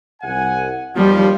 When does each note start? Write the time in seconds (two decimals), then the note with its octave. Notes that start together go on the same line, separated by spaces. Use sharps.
0.22 C2 F#5 G#5
0.96 D#2 F3 G3